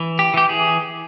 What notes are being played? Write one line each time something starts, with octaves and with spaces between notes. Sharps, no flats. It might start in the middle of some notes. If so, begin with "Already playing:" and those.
Already playing: E3
G4
E3 G4
G#4